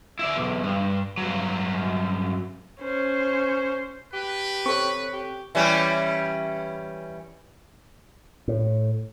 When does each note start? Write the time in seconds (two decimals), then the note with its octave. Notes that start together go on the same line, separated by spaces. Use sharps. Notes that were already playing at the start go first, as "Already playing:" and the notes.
0.19 E4 D5
0.36 B1 E2
0.63 G2
1.18 G2 F#3
2.81 C#4 C5
4.13 G4 B4
4.66 C4 A4 C#5 C#6
5.13 G4
5.55 E3 G3 C#4
8.48 A2